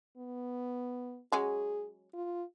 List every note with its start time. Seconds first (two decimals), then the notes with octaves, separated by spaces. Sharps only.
0.17 B3
1.32 F#3 G#3 C#4 G#4
2.14 F4